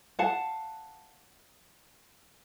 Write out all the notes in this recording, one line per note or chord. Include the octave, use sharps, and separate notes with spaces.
F5 F#5 A5